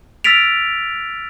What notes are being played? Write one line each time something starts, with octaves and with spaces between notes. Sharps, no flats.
E6 F6 A6 B6 D7 F7